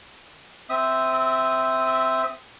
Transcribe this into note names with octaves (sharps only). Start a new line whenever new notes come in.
C4 E5 D#6